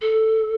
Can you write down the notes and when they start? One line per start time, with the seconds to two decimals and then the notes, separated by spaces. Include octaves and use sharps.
0.01 A4